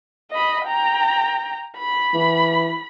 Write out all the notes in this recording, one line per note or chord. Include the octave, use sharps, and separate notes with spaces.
D#5 B5
G5 A#5
B5
E3